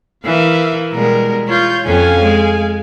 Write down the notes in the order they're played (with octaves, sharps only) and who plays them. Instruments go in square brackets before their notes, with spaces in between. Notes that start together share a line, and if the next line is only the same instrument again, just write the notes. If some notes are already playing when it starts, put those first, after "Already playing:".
[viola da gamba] E3 A#4 [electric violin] E5 F5
[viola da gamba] B2 G3 G#3 [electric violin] A#4
[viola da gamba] F4 [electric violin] C#5 G6
[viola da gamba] F2 C#4 [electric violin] F5 G#5
[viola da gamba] G#3